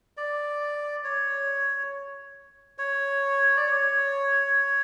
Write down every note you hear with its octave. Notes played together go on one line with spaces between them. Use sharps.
D5
C#5
C#5
D5
C#5